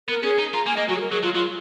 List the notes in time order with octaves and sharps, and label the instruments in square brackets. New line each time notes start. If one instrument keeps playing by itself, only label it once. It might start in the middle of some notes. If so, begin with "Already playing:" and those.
[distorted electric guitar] B3 [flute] A#4
[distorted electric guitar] C#4 [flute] G#4
[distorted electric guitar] D#4
[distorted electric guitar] F4 [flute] A#5
[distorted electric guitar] A#3 [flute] G#5
[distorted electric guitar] A#3 [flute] D#5
[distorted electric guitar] F#3 [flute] F#4
[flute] G#4
A#4
[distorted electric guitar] F#3 [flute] G#4
[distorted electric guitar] F#3 [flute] F4
[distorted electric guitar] F#3 [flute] F4